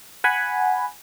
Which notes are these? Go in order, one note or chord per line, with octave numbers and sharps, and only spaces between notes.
F#5 G#5 B5